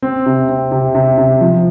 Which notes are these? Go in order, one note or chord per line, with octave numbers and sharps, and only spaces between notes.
C4
C3
C4
C3
C3
C3
F3